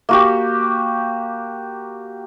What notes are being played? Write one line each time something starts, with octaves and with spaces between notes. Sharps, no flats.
A#3 F#4 G4